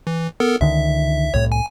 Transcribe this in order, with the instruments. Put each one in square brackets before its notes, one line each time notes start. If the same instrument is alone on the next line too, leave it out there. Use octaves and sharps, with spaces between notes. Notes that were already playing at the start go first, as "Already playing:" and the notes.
[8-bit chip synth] E3
B3 A4 A#4
[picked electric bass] C#2 D3 D#3 [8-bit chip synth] E5
[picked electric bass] C2 A2 [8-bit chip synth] C#5
[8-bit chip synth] G#5